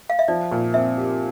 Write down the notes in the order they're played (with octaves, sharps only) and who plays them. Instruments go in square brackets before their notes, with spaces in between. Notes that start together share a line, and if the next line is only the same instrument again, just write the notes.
[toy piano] F5
E5
[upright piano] F3 [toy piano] D5
[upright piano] A#2
[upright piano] C4 [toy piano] E5
[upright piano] G4